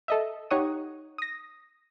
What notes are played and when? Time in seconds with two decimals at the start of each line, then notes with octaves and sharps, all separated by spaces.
0.08 A4 D#5 E5
0.51 D#4 G4 C#5 F#5 C#6 D#6
1.18 D#6 A#6